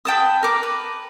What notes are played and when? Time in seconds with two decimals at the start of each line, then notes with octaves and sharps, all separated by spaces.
0.05 B4 G5 A5 D#6
0.43 A#4 D6
0.63 B4